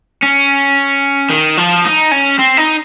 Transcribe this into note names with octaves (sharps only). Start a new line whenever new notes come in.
C#4
D#3
F3
D#4
C#4
C4
D#4